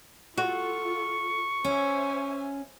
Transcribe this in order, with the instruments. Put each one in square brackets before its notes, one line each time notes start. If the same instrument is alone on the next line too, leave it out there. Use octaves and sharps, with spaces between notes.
[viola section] F4 A4 [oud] F#4 [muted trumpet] C#6
[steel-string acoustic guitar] C#4 [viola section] C5 E5 G#5